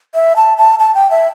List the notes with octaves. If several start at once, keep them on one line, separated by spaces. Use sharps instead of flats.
E5
A5
A5
A5
G5
E5